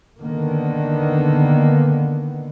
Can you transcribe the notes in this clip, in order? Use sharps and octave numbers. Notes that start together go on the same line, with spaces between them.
D3 D#3 A#3 B3